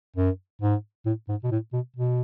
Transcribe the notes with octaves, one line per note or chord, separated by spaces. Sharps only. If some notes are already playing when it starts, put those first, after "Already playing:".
F#2
G#2
A2
G#2
B2
A2
B2
B2